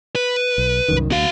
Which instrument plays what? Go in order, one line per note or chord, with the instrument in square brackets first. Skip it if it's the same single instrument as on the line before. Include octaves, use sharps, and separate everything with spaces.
[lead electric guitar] B4
[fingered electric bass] B1
C2 F#2 D#3
[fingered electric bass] D2 [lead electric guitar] F#4 F5